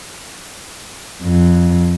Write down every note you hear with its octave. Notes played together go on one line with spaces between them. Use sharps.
F2